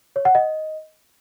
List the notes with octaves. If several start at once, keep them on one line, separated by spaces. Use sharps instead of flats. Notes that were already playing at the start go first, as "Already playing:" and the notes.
C#5
F#5
D#5